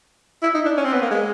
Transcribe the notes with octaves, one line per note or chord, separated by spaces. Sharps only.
E4
D#4
D4
C#4
C4
B3
A#3
G#3